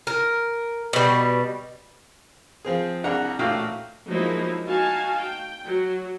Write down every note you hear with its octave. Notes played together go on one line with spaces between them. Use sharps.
A#4
B2 G3
F3 C4 G#4
C2 D4 G#4 F#5 A#5
A1 A#2 A3 F#4 F5 G5
F3 F#3 G#3 A#3 D#4 E4
D#4 F#4 F5 G#5 A5
G5
F#3